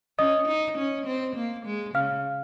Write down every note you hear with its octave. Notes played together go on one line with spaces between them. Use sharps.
C#4 D#5 D#6
D#4
C#4
C4
A#3
G#3
C#3 F5 F6